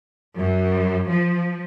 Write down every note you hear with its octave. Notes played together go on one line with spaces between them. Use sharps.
F#2
F3